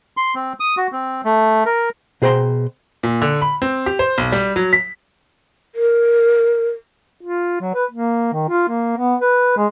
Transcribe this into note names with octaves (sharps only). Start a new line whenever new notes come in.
C6
C4
D#6
F#4
C4
A3
A#4
B2 G#4 C5 G5 A#5 C6
A#2
D3
B5
C4
G4
C5
B1
G3
F#3
B6
A#4
F4
F#3
B4
A#3
D#3
F4
A#3
B3
B4
G#3